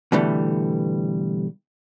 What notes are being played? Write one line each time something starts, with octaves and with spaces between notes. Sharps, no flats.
B2 D3 E3 G3 A3